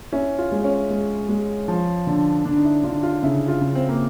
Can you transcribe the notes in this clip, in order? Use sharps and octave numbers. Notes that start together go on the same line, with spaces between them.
C#4 E4
F4
G#3
C#4
G#3
G#3
F3
D3
D3 D4
D#4
E4
D3 F4
F4
C#3 E4
F4
C#3
C4
A#3